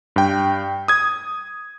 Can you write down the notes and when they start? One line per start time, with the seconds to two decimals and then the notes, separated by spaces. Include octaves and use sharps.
0.16 G2 G5
0.88 D#6 G#6